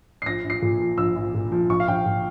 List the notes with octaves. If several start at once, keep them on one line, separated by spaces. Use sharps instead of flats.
C7
A#1 A#6
A#1
C7
A#2
F3
A#1 E6
A#1
A#2
F3
A#1 C#6
F5
A#1 G5
A#2